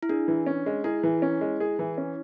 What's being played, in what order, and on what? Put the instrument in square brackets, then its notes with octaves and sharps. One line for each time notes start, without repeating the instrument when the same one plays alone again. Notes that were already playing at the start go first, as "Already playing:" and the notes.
[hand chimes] E4
[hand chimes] D4 [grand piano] G#4
[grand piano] E3
C#4
G#3
[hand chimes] E4 [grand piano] G#4
[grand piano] E3
C#4
G#3
G#4
E3
C#4